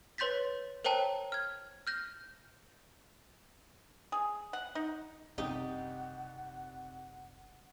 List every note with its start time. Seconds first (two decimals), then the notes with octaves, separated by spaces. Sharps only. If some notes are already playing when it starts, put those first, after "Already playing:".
0.18 B4 C#5 C6 G6 A6 B6
0.84 A#4 C5 C#5 G5 A5 A#5
1.32 F6 G#6
1.87 F6 G6 A#6
4.12 G#4
4.53 F#5
4.75 D#4
5.38 F#1 C2 C3 D#4 G4 F#5